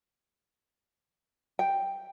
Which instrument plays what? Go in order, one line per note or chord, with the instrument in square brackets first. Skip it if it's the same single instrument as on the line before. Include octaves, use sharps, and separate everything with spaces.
[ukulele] G5